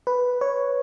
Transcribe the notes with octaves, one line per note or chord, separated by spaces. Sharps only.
B4
C#5